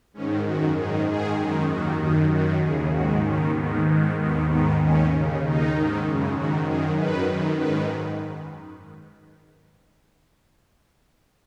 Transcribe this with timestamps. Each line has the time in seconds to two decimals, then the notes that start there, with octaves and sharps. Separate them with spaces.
0.14 G#2 D#3 C#4
0.45 F#2 D#3 F#4
0.77 G#2 D#3 G#4
1.08 G#2 D#3 G#4
1.38 F#2 D#3
1.69 D#2 D#3 F#4
2.00 F#2 D#3 D#4
2.32 F#2 D#3 F#4
2.62 D#2 C#3 G#4
2.93 G#2 D#3 F#4
3.25 D#2 D#3 C#4
3.56 G#2 D#3 B3
3.86 G#2 D#3 G#3
4.17 D#2 D#3 B3
4.49 G#2 D#3 B3
4.80 D#2 D#3 C#4
5.11 D#2 C#3
5.42 D#2 D#3 D#4
5.73 G#2 D#3
6.04 F#2 C#3
6.35 G#2 D#3 F#4
6.67 F#2 D#3 G#4
6.97 F#2 D#3 B4
7.29 F#2 D#3
7.59 G#2 D#3 B4